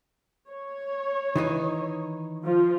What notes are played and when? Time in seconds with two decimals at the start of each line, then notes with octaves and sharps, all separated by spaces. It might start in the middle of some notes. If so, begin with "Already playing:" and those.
0.48 C#5
1.36 D#3 E3 D#4
2.43 F3 F4